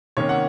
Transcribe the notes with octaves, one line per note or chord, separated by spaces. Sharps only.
C3 D#3 A#3 C#4 C#5
F#5